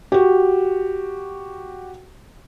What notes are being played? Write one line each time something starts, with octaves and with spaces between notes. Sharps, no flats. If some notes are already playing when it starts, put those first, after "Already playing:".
F#4 G4